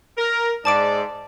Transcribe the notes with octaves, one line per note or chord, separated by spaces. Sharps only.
A#4
G#2 D5 A5 D6 D7